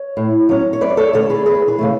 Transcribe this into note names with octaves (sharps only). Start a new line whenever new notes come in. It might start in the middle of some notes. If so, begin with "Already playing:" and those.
Already playing: C#5
A2
F#3 C#4
C#5
F#2 B4 D5
A4 C#5
D3 A3 C#4 A4 C#5
G#4 B4
E2 G#4 B4
G#4 B4
C#3 E3 A3